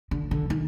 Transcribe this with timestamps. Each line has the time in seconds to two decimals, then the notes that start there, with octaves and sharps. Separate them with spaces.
0.11 D3
0.31 D3
0.50 D#3